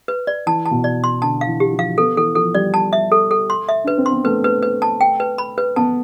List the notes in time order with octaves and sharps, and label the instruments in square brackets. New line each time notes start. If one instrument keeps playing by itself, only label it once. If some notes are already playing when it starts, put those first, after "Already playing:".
[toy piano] B4
D5
[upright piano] E3 [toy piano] A5
[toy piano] A5
[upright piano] B2
[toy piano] D5
C6
[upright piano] D3 [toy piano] A5
[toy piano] F5
[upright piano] E3
[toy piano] G4
[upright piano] F3
[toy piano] F5
[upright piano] B3 [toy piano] A4
[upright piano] E3 [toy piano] A4
[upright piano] F3 [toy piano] A4
[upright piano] G3 [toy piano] D5
[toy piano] A5
E5
A4
A4
C6
E5
[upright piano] D4 [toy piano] B4
[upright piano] C4
[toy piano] C6
[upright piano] B3
[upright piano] A3 [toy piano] B4
[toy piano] B4
B4
A5
G5
B4
B5
B4
[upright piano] B3 [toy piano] A5